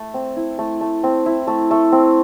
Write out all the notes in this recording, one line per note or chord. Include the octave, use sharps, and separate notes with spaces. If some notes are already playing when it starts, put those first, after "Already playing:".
Already playing: A3
C4
E4
A3
A3
C4
E4
A3
A3
C4